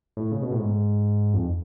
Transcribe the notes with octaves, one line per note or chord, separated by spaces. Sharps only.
A2
C#3
B2
A2
G#2
F2